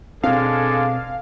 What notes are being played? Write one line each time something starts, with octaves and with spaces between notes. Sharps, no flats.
B2 G#3 C4 D4 A4 F5